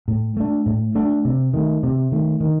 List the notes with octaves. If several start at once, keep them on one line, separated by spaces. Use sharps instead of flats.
A2
A3 D4
A2
A3 D4
C3
D#3 A3
C3
D#3 A3
D#3